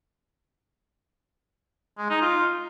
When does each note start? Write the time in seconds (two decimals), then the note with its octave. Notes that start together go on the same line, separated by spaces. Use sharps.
1.98 G#3
2.10 D#4
2.22 F4